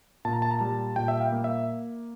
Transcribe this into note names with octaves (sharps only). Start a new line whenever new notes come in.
A#2 A5
A#5
A5
A#5
G3 A5
A#2 G5
E5
F5
A#3
E5